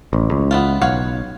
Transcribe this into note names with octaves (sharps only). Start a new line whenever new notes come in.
A1
C#2
B3 E4 F4
B1 C#5 F5 F#5